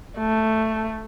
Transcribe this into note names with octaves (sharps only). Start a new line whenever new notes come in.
A3